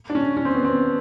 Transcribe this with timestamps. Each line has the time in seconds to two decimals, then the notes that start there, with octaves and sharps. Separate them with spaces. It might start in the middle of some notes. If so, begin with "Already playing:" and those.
0.10 D4
0.15 C#4
0.37 C#4
0.45 C4
0.55 B3
0.64 C4